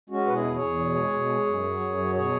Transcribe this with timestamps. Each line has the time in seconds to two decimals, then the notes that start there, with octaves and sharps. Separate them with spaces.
0.10 G#3 C#4 F#4
0.27 B2 B4
0.33 E4 G#4
0.44 E2
0.55 G#4 C#5
0.61 E2
0.79 B2
0.96 G#3
1.13 B2
1.29 G#3
1.47 F#2
1.63 F#3
1.80 F#2
1.97 F#3
2.14 B2 G#4 C#5